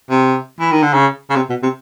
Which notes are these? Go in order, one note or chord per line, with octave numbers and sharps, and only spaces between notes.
C3
E3
D#3
D3
C#3
C#3
C3
B2
C3